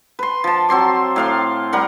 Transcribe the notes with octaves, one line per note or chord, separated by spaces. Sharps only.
B4 C6
F3 A5
F#3 C4 C6 D6
A2 F5 C6
G3 A#4 F#5